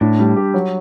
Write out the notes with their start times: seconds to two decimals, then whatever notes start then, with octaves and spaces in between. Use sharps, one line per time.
0.01 A2 D4
0.19 G3
0.36 G4
0.54 F#3